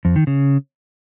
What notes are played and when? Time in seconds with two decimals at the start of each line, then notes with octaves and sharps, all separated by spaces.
0.05 F2
0.16 D#3
0.27 C#3